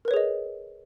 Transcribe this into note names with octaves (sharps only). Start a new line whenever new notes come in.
G#4 A#4 B4 C#5 D#5